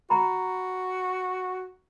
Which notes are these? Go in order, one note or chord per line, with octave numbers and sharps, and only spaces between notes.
F#4 A#5 B5